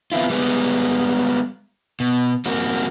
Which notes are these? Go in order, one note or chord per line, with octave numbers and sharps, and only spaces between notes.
E3 B3 C4 E4 F4
G3 G#3 B3
B2
G3 A#3 C4 F#4